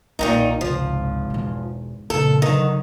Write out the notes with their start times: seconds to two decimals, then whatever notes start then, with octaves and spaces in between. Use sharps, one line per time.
0.19 B1 A#2 D#3 C#4 D#4
0.61 G#1 C#2 C3 F3
1.30 E2 B2
2.10 F2 A#2 C#3 A4
2.42 D3 D#3 F#3